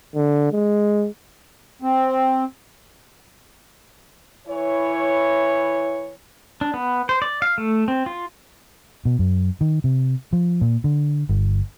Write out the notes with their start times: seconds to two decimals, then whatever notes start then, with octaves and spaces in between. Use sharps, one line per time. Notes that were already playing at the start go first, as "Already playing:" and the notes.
0.15 D3
0.52 G#3
1.82 C4
4.47 E3 E4 C#5
6.61 D4
6.74 B3
7.09 C5
7.22 D5
7.42 F5
7.58 A3
7.88 C4
8.06 F4
9.05 B2
9.19 F#2
9.61 D#3
9.84 C3
10.33 F3
10.61 A#2
10.84 D3
11.29 G1